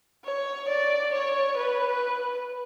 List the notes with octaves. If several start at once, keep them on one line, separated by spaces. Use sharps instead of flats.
C#5
D5
C#5
B4